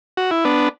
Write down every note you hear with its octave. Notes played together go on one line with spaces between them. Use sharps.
F#4
E4
B3 D4